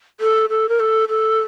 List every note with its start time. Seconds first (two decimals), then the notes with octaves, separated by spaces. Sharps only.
0.20 A4
0.50 A4
0.69 A#4
0.80 A4
1.09 A4